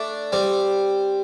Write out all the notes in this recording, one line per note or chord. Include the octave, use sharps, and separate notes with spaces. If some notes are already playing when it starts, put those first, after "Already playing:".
Already playing: A3 D4
G3 C4